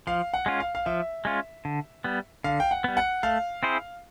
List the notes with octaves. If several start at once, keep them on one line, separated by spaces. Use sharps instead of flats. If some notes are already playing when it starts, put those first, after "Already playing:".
F3 F5
F#5
G#3 C#4 F4
F5
F5
F3 E5
G#3 C#4 F4
D3
G3 B3
D3 F5
G5
F#5
G3 B3
F#5
A3 F5
C4 E4 G#4 C5